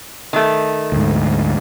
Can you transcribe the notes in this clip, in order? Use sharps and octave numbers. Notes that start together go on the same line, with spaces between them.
D#3 A3
D2 G#2